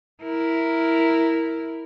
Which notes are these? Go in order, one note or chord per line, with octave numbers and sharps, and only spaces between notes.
E4 A#4